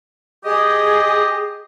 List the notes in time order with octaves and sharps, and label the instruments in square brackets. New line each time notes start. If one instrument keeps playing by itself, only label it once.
[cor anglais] G4 [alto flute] G#4 [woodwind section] D#5 D#6